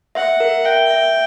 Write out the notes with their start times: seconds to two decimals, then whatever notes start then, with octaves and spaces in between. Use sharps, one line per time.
0.15 E5 F#5
0.40 A#4
0.65 E5 G5
0.90 E5